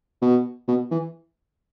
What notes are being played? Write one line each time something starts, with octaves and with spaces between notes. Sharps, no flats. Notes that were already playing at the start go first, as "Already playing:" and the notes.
B2
B2
E3